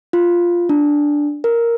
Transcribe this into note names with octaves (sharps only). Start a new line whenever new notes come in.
F4
D4
A#4